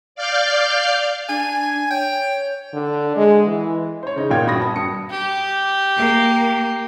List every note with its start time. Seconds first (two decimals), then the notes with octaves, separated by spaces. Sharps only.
0.15 D5 F5 F6 G6
1.29 D4 G#5
1.91 C#5 G5
2.73 D3
3.16 G#3
3.47 E3
4.03 C5 C#5
4.16 C#3 D#4
4.30 G#1 A#2 F4 F5 G5 G#6
4.46 G2 B3 F#4 B5 D#6 A#6
4.60 A5 D#6
4.74 G2 C#7
5.10 G4
5.95 A#3